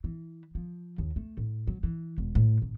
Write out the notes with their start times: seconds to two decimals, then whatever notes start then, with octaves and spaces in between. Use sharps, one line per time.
0.04 E3
0.55 F3
0.98 D#2
1.16 A3
1.37 A2
1.67 F#3
1.83 E3
2.18 E1
2.35 A2
2.62 G#1